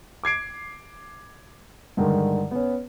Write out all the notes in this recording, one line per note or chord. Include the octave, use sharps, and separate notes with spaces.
D6 G#6 C7 D7
G2 D3 D#3 G#3
B3 C#4